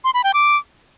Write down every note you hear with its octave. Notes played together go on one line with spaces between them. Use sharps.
C6
B5
G5
D6